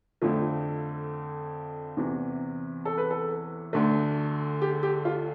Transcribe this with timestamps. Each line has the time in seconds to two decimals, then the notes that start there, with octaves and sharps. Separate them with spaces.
0.22 F2 D3 F3 A3
1.97 E2 C3 E3
2.85 A4
2.98 B4
3.10 A4
3.73 D2 D3 A3
4.62 G4
4.83 G4
5.05 F4